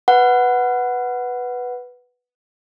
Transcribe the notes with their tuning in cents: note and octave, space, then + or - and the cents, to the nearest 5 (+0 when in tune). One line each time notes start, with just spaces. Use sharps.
B4 +0 F#5 +0